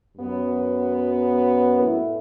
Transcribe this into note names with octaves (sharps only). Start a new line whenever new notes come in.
F#2 F#3 B3
A2 A3 E4